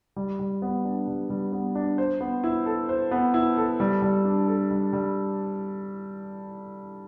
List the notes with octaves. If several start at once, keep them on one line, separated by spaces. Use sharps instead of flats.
G3
G3
B3
D4
G3
G3
B3
D4
C5
B3
E4
A4
C5
B3
E4
A4
G3
G3
D4
A4
G3
G3